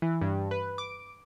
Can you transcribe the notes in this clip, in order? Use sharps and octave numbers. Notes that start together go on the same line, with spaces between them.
E3
G2
B4
D6